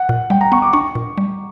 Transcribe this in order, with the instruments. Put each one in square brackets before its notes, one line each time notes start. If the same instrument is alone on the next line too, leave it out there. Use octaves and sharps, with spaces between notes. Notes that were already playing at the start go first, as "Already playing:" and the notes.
Already playing: [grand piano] F#5
[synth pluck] A#2
[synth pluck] G3 [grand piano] G5
[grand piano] A#5
[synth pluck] B3 [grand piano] C#6
[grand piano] D6
[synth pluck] D4 [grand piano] C#6
[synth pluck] A#2
G3